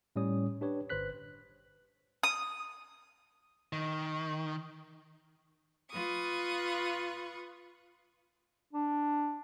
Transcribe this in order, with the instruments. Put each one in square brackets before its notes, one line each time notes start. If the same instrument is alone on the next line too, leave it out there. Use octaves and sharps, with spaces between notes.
[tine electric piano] A2 G3 C#4 C#5 D#6
D4 G4 B4 C#5
G1 B4 C5 F#6 B6
[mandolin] D#6
[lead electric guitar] D#3
[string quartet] F4 B4 C#6 D#6
[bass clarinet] D4